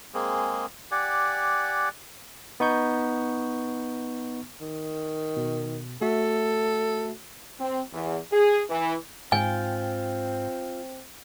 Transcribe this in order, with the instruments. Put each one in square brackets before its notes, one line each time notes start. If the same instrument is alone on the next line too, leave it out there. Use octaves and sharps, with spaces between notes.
[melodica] G#3 A#3 C4 G#4
G4 D5 F#5 G#5
[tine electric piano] B3 D#4 C#6 G6
[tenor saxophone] D#3
[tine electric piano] B2
[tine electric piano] A3 F#4 E5 [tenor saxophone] A4
[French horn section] C4
E2
G#4
E3
[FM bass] G#2 [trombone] C4 [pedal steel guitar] F4 G5 [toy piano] G#5